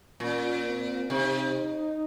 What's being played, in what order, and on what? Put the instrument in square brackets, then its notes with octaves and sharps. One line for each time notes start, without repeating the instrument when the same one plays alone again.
[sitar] A#2 [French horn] C#4
[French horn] C4
[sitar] C3 [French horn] D#4